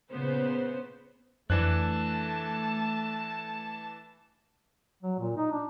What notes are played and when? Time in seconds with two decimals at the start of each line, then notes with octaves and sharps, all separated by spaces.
0.11 A#2 C#3 B3 C5
1.50 F2 E3 A3 D4 A5 F#6
5.02 F#3
5.19 A#2
5.37 D#4
5.52 D4